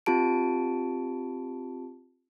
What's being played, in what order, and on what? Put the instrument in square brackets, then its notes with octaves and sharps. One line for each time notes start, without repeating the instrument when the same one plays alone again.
[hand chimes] C4 F4 G4 A5 D7